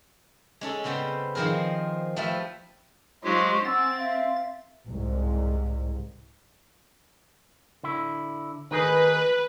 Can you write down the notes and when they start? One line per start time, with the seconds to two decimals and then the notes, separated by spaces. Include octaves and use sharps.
0.61 G#3 C#4 A4
0.84 C#3 G3 B3 C4 G5
1.35 D#3 F3 C4 G#4 A#4
2.16 F3 G3 A3 B4 E5
3.24 F#3 G#3 D#4 F4 G4 C5 C#6
3.65 C4 F#5 G#5 E6 A6
3.99 E5 F5
4.89 C2 G#2
7.83 D3 E4
8.71 D#3 D#4 G#4 B4